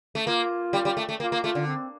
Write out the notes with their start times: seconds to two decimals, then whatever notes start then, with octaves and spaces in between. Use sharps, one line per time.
0.15 A3
0.26 A#3 F4
0.73 G3
0.85 G3
0.97 A3
1.09 A3
1.19 A#3 F4
1.32 A#3
1.43 A3 F4
1.55 D3
1.66 C4